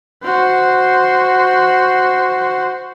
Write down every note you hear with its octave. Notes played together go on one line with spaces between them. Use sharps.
F#4 C5